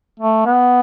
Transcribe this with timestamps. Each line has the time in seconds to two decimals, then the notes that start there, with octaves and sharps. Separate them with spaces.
0.20 A3
0.46 B3